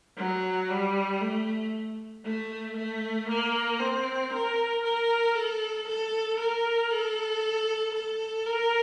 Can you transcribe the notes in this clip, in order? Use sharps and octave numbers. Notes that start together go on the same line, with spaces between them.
F#3
G3
A3
A3
A3
A#3
C4
A#4
A#4
A4
A4
A#4
A4
A4
A#4